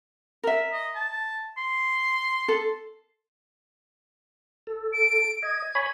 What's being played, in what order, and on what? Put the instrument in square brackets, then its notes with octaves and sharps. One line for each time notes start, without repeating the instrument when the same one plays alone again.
[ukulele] A#4 E5
[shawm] D#5
A5
C6
[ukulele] A4
[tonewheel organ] A4
[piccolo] D7
[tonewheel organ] D#5 [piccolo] G#6
[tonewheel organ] C#5 G#5 B5